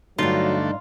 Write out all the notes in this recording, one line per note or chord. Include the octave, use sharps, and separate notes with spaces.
G2 D3 F#3 A3 D#4 F4